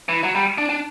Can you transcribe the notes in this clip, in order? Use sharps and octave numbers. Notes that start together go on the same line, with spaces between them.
E3
F#3
G3
D4
D4